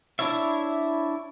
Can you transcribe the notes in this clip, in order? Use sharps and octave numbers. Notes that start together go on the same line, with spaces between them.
D4 E4 C#5 E5